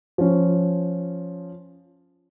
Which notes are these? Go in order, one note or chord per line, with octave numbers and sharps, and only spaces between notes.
F3 C#4